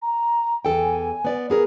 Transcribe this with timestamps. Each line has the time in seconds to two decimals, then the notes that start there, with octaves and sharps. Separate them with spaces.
0.02 A#5
0.65 E2 A4 G5 G#5
1.25 B3 D5
1.50 B3 G#4 A#4